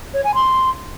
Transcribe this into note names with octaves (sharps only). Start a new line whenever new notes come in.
C#5
G#5
C6